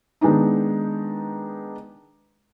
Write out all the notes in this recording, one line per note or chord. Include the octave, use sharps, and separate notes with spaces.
D#3 G#3 B3 D4 D#4